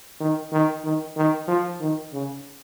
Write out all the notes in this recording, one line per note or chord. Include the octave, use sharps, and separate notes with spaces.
D#3
D#3
D#3
D#3
F3
D#3
C#3